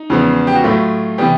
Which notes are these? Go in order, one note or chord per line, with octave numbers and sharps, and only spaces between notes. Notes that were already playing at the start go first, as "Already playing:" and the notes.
Already playing: D#4
E2 C#3 F3 G#3 B3
G4
F#4
A2 F#3 A3 F4
C3 E3 G3 B3 G4